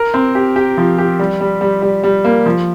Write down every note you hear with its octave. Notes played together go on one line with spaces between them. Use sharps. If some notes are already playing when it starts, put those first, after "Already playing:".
Already playing: A#4
C4
G4
G4
F3
G4
G3
G3
G3
G3
G3
A#3
F3